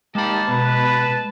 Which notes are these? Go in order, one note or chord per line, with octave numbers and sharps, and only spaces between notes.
G#3 A#3 D#4 G4 A5 B5
B2 B4